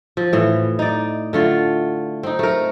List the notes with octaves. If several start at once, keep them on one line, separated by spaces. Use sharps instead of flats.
F3
A2 E3
D#4 D5
D3 A3 F4
C4 D#4
A3 A#4